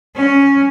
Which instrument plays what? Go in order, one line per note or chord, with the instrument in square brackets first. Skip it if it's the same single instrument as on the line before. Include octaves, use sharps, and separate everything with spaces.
[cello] C#4